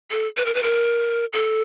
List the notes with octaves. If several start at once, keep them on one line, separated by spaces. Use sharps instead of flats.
A4
B4
A#4
B4
A#4
A4